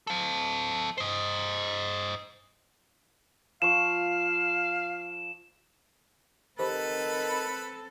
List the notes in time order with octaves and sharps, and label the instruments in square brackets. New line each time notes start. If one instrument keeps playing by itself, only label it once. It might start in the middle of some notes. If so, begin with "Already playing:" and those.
[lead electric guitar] A4 F5
C5 D#5
[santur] F3 C#6 [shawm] F5 [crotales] E7
[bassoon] D#3 [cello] C4 A4 [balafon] G4 C5 [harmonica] B4 B5